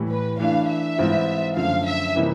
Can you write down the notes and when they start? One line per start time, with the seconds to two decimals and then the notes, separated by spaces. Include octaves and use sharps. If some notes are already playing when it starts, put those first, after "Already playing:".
Already playing: A2 E3 G3
0.10 B4
0.39 E3 A3 D4 F5
0.69 E5
0.98 G#2 E3 G3 C4 F4
1.56 F#2 D3 F3 A3 F5
1.86 E5
2.15 C3 E3 G3 A#3 D#4